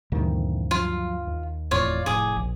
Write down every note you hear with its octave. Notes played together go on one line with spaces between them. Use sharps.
D2 G2 A#2 D#3 E3 C4
F3 F#3 F4
D#2
E1 F2 A2 F4 C#5 D5
F1 A2 G#4 D6
A#1